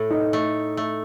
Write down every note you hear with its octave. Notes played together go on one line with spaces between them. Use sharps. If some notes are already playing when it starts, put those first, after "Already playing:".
Already playing: A2 A3
D#4
A3
A3